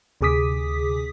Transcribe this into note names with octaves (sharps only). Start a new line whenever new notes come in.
D2 C3 G#4 D6 D#6 B6